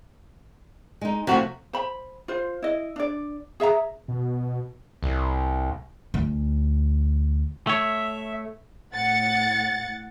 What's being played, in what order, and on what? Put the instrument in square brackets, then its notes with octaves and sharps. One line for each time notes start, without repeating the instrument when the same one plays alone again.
[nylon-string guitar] G#3 D#4
[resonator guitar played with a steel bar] C3 F#4 [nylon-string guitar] F3 A3
[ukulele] C5 B5
F4 C5
E4 D#5
D4 D5
G#4 E5 F5 A#5
[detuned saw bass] B2
[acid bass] C2
[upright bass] D2
[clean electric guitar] A3 C#5 [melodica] E5
[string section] A2 F#5 A6 C#7